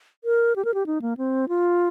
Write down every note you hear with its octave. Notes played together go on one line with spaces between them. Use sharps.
A#4
G4
A#4
G4
D#4
A#3
C4
F4